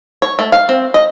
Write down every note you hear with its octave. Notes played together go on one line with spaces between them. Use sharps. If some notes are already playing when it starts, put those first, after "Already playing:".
C#5
A3
F5
C4
D#5